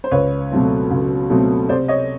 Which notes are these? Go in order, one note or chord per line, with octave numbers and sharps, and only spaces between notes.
C5
C#2 B4 C#5
B2 F#3 A3 C4
C#2
B2 F#3 A3 C4
C3 C5 D5
C#5 D#5